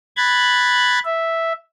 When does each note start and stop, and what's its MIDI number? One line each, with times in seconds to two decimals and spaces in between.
0.17 0.99 83
0.17 0.99 90
0.17 0.99 92
0.17 0.99 93
1.04 1.52 76